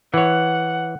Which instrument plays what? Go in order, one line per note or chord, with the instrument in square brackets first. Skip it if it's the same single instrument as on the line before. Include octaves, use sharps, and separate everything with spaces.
[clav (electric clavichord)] E3 C#5 [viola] F#5